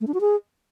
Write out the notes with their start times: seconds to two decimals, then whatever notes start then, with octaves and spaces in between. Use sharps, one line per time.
0.01 A3
0.07 D4
0.14 F#4
0.21 G#4